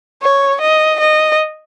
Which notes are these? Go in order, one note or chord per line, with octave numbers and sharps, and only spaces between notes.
C#5
D#5
D#5